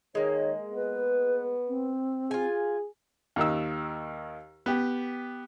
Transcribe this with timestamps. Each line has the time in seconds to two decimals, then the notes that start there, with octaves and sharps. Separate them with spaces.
0.15 D#3 G#3 A#3 C#5
0.74 B3 B4
1.68 C4
2.31 F4 G#4 G#5
3.36 D#2 D#3 E6
4.66 B3 G4